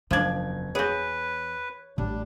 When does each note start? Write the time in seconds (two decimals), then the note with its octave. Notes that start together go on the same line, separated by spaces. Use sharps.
0.11 F#1 E2 F3 D4 G#6
0.75 F#4 G#4 B4 C#5 G6
1.98 A1 G3 D4